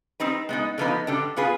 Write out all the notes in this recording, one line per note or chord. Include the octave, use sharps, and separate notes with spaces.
G3 C4 D#4 B4
G#3 B3 D#4
D3 F3 B3 D#4 B4
D3 G3 D4
B3 F4 G#4 B4